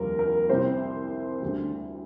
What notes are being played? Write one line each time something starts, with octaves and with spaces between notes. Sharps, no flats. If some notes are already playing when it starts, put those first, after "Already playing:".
Already playing: F1 D#2 D3 G3 A#4
A#4
C2 C3 G3 C5
D2 D3 G3